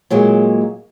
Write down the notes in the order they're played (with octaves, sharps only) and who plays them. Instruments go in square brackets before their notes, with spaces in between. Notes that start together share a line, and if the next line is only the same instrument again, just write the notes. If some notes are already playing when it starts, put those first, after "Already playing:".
[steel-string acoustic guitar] A#2 F#3 G#3 A#3